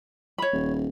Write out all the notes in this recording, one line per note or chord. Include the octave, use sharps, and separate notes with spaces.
C#5 B5
D#1